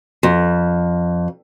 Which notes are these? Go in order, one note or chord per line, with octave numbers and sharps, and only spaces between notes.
F2